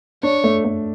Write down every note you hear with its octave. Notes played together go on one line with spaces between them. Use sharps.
D4 C#5
A3
A3